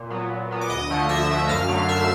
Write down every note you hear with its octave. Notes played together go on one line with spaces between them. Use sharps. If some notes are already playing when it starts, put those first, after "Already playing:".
Already playing: A#2
F#3 B3
A#2
F#3 B3
D6
D2 D#5 D#6
D3 F3 A3
D2 E5 E6
D3 F3 A3
F#2 F5 F6
D3 F#3 A3
F#2 E5 E6